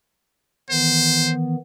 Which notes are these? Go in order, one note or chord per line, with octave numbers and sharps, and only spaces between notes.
D#3 E3 B3 C5